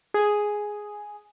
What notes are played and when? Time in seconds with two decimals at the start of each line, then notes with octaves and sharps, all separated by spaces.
0.14 G#4